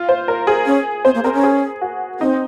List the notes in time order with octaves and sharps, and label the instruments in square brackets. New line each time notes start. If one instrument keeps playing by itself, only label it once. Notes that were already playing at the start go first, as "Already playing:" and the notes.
Already playing: [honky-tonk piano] F4
C5
A#4
G#4
[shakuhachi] C#4
[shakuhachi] C4 [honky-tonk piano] C5
[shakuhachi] A#3
[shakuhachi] C4 [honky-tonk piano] A#4
[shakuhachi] C#4
[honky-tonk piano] G#4
F#4
[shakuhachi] C4 [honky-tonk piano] D#4